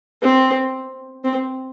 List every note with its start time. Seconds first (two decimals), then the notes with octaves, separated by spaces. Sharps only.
0.22 C4
1.24 C4